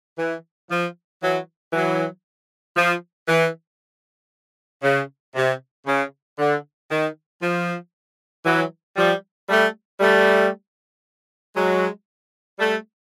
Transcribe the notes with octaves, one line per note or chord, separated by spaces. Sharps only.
E3
F3
E3 F#3
E3 F#3
F3
E3
C#3
C3
C#3
D3
D#3
F3
E3 F#3
F3 G3
G3 A3
G3 A3
F#3 G#3
G3 A3